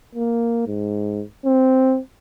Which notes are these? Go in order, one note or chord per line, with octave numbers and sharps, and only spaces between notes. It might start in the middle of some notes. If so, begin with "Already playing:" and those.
A#3
G#2
C4